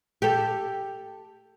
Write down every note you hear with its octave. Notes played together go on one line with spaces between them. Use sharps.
G4 A4